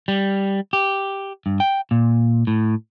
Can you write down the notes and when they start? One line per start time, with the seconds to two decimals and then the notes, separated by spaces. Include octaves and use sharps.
0.08 G3
0.73 G4
1.46 G2
1.60 G5
1.91 A#2
2.47 A2